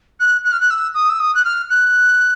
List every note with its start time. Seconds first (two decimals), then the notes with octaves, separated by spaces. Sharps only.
0.19 F#6
0.44 F#6
0.52 F6
0.60 F#6
0.70 E6
0.94 D#6
1.09 E6
1.19 D#6
1.34 F#6
1.44 F6
1.69 F#6